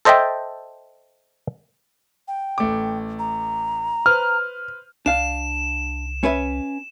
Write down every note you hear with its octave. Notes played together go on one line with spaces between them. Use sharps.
A4 C5 D#5 E5 G5 A5
G5
A1 A3 D6
A#5
B4 C5 F6
C2 D4 F5 E7
C#4 B4 E5